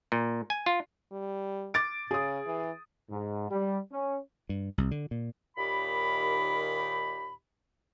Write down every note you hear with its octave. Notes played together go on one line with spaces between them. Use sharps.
A#2
G#5
F4
G3
D6 A6 D7
C#3 G#4 D#6
E3
G#2
G3
C#4
G2
C2
D3
A#2
D#2 A#2 D#3 G4 B5